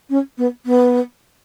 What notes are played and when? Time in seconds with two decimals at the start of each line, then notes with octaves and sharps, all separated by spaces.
0.09 C#4
0.38 B3
0.65 B3